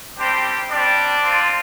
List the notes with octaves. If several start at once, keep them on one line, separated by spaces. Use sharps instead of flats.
G3 C4 D4 G4 C5
G3 C4 D4 G4 D5
C4 F4